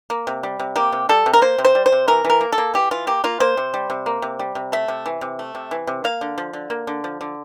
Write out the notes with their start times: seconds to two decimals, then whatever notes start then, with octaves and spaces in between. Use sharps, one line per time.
0.10 A#3
0.27 C3
0.43 G3
0.59 C3
0.76 A#3 G4
0.92 C3
1.09 G3 A4
1.26 C3
1.33 A#4
1.42 A#3 C5
1.58 C3
1.65 C5
1.75 G3
1.86 C5
1.92 C3
2.08 E3 A#4
2.25 E3
2.30 A#4
2.41 A#3
2.52 A4
2.58 A#3
2.74 E3 G4
2.91 E3 F4
3.07 A#3 G4
3.24 A#3 F4
3.40 A#3 C5
3.57 C3
3.74 G3
3.90 C3
4.06 A#3
4.22 C3
4.39 G3
4.55 C3
4.72 A3 E5
4.88 C3
5.06 E3
5.21 C3
5.39 A3
5.55 C3
5.71 E3
5.87 C3
6.04 A#3 F5
6.21 D3
6.38 F3
6.53 D3
6.70 A#3
6.87 D3
7.04 F3
7.21 D3